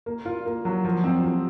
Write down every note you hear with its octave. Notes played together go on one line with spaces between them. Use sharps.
A#3
F4
A#3
F#3
F3
C4
F3